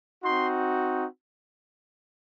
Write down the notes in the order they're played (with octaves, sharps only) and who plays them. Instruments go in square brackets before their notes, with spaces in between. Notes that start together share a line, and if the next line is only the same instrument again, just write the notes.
[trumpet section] C4 D#4 F#4 C6